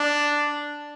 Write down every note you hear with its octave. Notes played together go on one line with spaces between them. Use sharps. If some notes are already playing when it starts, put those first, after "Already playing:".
Already playing: D4